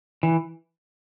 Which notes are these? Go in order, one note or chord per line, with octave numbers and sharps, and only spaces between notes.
E3